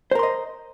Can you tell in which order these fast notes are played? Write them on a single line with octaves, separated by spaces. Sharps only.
C5 A#4 C6 D#5